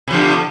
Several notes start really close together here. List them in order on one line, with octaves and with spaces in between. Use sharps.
B2 F3 D3